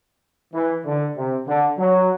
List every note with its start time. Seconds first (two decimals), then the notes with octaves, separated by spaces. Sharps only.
0.54 E3
0.85 D3
1.17 C3
1.47 D3
1.79 F#3